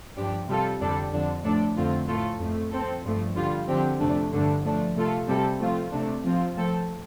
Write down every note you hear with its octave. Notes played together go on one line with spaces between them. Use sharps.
G2 F3 D4 G4
C3 G3 F4 A4
F2 D3 G3 D4 A4
F2 D3 F3 D4
A2 F3 D4 A4
F2 D3 A3 C4 F4
A2 A3 F4 A4
F2 F3 A3
F3 C4 A4
G2 F3 A3
D3 G3 F4
D3 F3 C4 G4
F2 C3 A3 D4
G2 D3 A3 D4
F3 A3 D4
C3 A3 F4 A4
C3 G3 C4 A4
F3 A3 C4 F4
C3 A3 D4
F3 C4 F4
F3 A3 C4 A4